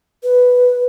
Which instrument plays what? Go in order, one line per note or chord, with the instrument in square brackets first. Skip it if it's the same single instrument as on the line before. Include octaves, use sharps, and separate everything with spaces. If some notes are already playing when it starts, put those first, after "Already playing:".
[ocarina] B4